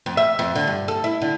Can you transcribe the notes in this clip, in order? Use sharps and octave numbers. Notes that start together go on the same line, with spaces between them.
F2
E5
F2
D3
G2
A4
E4
D3